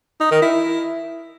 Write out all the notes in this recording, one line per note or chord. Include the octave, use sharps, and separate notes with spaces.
D#4
D#3
E4